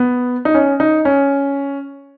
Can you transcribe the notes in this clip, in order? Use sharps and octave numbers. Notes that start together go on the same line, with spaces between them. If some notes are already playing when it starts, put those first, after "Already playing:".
Already playing: B3
D#4
C#4
D#4
C#4